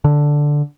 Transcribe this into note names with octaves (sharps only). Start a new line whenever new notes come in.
D3